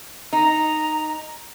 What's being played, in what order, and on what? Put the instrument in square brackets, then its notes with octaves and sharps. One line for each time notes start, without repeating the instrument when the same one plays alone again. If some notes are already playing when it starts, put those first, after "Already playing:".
[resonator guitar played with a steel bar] D#4 [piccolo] A#5